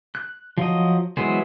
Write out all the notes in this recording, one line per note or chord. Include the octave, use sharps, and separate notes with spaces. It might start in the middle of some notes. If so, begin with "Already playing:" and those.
F#6
F3 F#3 D#5
E3 F#3 G#3 B3 C5